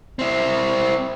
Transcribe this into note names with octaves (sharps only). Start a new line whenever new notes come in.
C4 E4